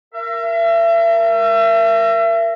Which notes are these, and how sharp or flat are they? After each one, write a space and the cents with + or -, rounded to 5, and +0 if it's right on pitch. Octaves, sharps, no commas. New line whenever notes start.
A#4 +0 E5 +35